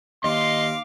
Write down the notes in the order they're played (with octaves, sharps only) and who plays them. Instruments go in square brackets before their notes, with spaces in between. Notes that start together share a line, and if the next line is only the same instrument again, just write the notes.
[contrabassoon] D#2 [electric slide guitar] D#5 [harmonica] F5 D6 [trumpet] C6